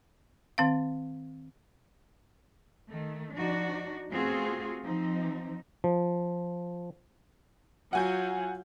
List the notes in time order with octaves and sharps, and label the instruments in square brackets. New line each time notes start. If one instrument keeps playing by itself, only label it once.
[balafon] D#3 C4 F5
[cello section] D#3 A3
F3 D4 D#4 F#4 D5
A3 B3 C4 F4 F#4 G#4
F3 C4 D#4
[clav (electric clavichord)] F3
[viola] F#3 F4 [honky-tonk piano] F#5 G#5 G6